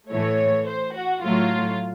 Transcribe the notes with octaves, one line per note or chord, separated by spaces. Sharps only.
A2 E3 A3 C#5
C5
F#4
A2 F#3 A3 F4